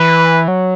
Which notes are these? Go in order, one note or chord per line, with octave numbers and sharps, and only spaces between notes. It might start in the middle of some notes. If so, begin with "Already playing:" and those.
Already playing: E3 B4
F#3